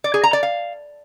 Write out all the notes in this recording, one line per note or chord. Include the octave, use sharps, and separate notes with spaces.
D5
G#4
A#5
D5
F5